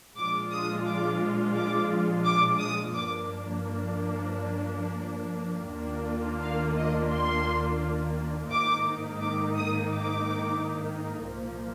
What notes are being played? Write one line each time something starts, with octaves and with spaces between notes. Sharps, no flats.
A#2 F3 G#3 D4 F4 D6
D#6
D6
D6
D6
D#6
G2 F3 A#3 D4 D6
D#2 D#3 A#3 D4 F4
F5
D#5
C6
G#2 D#3 A#3 D#4 D6
D6
D#6
D6
C2 A#2 F3 A#3